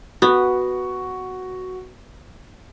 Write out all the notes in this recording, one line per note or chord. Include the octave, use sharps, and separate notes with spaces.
B3 F#4